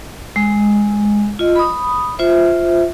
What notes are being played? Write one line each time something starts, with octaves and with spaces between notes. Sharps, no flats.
G#3
F4 D#5
B5 D#6
F4 C5 E5